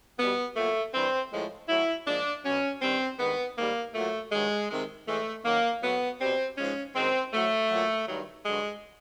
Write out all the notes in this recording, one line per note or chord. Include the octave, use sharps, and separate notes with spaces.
B2 G3 B3
A#2 F#3 A3
G2 E3 G3 C4
A2 F3 G#3
A2 F#3 E4
A#2 F3 G#3 D4
B2 F#3 C#4
G2 D#3 G3 C4
G2 D#3 G#3 B3
G#2 D#3 G3 A#3
A#2 F#3 A3
G2 D#3 F#3 G#3
C3 D#3 G#3
A2 E3 G#3 A3
F#2 D#3 F#3 A#3
A2 F#3 B3
B2 G3 C4
G#2 F3 G#3 C#4
F#2 D#3 G#3 C4
A2 F#3 A3
A#2 F#3
G2 D#3 F#3
G2 D3 F#3 G#3